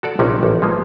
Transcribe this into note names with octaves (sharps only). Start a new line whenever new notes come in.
F#4 A4 D5
A#1 C3 C#4 D#4
A1
F3 G#3 A#3